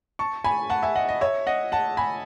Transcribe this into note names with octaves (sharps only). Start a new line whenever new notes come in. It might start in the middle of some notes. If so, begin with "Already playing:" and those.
A5 C#6
G#5 B5
F#5 A5
E5 G#5
D#5 F#5
D#5
C#5 E5
D#5 F#5
F#5 A5
G#5 B5